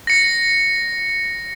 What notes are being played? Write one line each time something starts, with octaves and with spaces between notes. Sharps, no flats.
A#6 C#7